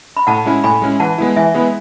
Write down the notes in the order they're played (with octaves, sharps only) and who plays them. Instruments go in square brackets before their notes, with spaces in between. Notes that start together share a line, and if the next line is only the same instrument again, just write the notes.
[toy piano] B5
[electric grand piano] A2 [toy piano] F#5 A5
[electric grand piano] G#3 C#4 E4
[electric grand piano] A2 [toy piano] G#5 B5
[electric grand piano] G#3 C#4 E4
[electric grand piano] E3 [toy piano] F#5 A5
[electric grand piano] G#3 B3 E4
[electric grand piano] E3 [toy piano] E5 G#5
[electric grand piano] G#3 B3 E4